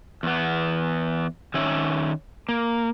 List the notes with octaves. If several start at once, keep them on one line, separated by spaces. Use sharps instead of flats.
E2 B3
D#3 C#4 C#5 E5
A#3